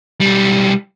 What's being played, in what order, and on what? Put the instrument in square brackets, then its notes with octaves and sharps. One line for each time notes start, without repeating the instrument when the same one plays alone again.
[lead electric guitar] B1 G3